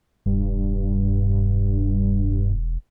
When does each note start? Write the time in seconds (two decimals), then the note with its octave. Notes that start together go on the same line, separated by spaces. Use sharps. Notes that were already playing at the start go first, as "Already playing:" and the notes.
0.26 E1 G2